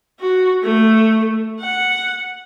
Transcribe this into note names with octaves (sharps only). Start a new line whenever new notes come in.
F#4
A3
F#5